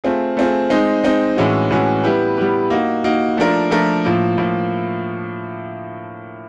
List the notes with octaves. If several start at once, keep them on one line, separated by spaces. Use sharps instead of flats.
A3 C4 F4 G#4
A3 C4 F4 G#4
G#3 C4 D#4
G#3 C4 D#4
A2 E3 G#3 C#4 F#4
A2 E3 G#3 C#4 F#4
G3 B3 E4 G4 B4
G3 B3 E4 G4 B4
A#3 D#4 F#4
A#3 D#4 F#4
F3 A3 D4 F4 A#4
F3 A3 D4 F4 A#4
A2 F3 A#3
A2 F3 A#3